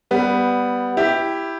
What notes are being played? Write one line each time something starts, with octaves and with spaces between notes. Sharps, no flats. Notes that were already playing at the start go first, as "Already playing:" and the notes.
G3 B3
E4 G4